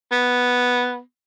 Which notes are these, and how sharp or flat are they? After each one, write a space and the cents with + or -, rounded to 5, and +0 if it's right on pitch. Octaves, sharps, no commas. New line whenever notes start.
B3 -5